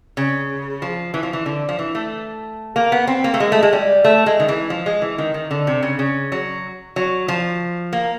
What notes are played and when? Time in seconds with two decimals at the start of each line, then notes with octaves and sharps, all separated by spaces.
0.17 C#3
0.82 F3
1.14 E3
1.23 F3
1.33 E3
1.46 D3
1.69 F3
1.79 E3
1.95 A3
2.76 A#3
2.92 B3
3.07 C4
3.24 A#3
3.34 A3
3.40 G#3
3.52 A3
3.63 G#3
3.73 G3
4.04 A3
4.26 G#3
4.40 D#3
4.48 E3
4.70 F3
4.86 G#3
5.02 E3
5.18 D#3
5.34 D#3
5.51 D3
5.67 C3
5.83 C#3
5.99 C#3
6.32 F#3
6.96 F#3
7.28 F3
7.93 A#3